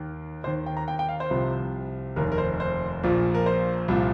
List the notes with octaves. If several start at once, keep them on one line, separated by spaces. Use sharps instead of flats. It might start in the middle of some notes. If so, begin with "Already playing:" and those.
Already playing: D#2 D#3
D#2 D#3 C5
G5
A#5
G5
G5
F5
C5
C2 C3 F3
F1 D#2 D#3 A#4
A#4
C5
C5
A#1 A#2 F3
A#4
C5
C2 A#2 F3